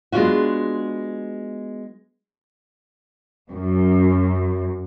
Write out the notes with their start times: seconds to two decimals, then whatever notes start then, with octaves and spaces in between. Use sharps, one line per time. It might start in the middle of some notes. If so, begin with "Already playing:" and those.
0.12 G#3 B3 D4 F4 F#4
3.50 F#2